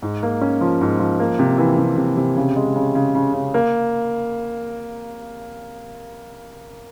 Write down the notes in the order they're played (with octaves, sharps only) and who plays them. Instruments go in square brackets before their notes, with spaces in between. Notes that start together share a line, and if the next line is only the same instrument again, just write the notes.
[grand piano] G#2
A#3
C#4
F3
G#2
F3
A#3
C3
E3
C3
C3
C3
C#3
G#3
C#3
C#3
C#3
C#3
A#3